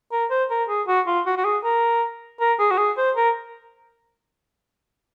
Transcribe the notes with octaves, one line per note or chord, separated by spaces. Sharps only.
A#4
C5
A#4
G#4
F#4
F4
F#4
F#4
G#4
A#4
A#4
G#4
F#4
G#4
C5
A#4